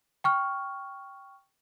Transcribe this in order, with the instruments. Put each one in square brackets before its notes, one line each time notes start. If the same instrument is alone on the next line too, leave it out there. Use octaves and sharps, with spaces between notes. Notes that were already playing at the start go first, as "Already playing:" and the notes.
[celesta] G5 C#6 F6